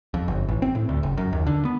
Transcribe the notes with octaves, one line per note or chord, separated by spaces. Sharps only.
F2
G1
A1
C4
A2
D2
F#1
F#2
D#2
D3
B3